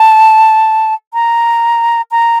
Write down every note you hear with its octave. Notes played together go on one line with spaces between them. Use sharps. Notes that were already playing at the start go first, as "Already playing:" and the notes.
Already playing: A5
A#5
A#5